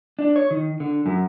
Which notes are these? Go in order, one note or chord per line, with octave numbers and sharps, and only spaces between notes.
D4
C#5
D#3
D3
F#2